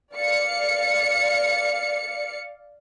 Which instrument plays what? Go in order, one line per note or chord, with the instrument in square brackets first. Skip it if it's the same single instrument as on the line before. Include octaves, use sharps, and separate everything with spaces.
[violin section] D5 F5 C#7